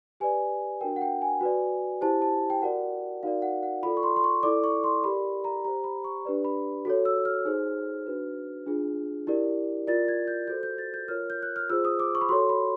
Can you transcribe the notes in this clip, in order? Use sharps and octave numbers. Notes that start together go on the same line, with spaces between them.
G4 B4 D5 G#5
D4 F#4 A#4 G5
F#5
G5
G#5
F#4 B4 D5
E4 G4 C5 A5
A5
G5
F#4 A#4 D5 F#5
D#4 F#4 A#4 D5 F5
F#5
F#5
F4 A4 D5 B5
C#6
C6
C6
C#6
E4 A4 D5 D6
C#6
C6
G4 A#4 D5 B5
A#5
G4 C5 A#5
B5
C#6
D4 G4 B4 D5
B5
F#4 A4 C#5
E6
F6
D#4 G#4 C5
D4 F#4 B4
D4 F4 G#4
E4 G4 A#4 D5
F4 A#4 D5 A6
G#6
G6
F#4 A4 C5 G6
G6
A6
G6
F4 A#4 C#5 F6
G6
F#6
F6
F4 G#4 C5 E6
D#6
D6
C#6
B5
F#4 A4 C#5 C6
B5